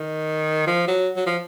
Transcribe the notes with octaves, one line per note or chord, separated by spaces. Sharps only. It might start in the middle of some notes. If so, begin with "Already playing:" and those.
Already playing: D#3
F3
F#3
F#3
F3